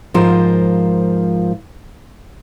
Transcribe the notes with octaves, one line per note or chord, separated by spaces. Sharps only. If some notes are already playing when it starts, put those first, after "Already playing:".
G#2 F3 F4 A#4 C5